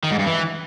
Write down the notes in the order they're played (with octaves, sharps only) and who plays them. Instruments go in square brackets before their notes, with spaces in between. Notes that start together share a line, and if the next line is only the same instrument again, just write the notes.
[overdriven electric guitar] D#3
G#2
G2
E3